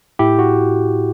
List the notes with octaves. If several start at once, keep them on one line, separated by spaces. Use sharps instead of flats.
A2 E4 G4
F#4